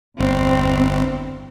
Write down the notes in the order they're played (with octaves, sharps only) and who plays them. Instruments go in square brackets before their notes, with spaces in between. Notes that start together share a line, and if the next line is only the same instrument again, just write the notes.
[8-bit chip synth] G1 [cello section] E2 C4